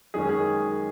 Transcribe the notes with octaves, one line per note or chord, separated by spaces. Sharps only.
F#2 D#3 G#3 C#4 G#4
G#4